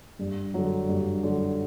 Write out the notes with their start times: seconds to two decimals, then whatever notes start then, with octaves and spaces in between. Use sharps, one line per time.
0.19 G2
0.54 D3 F#3
0.89 G2
1.23 D3 F#3